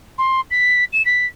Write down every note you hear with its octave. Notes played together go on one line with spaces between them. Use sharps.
C6
B6
E7
B6